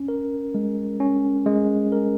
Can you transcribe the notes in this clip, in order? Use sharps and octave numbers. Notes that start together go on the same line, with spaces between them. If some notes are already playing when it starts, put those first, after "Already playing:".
Already playing: C#4
A#4
G#3
C#4
G#3
A#4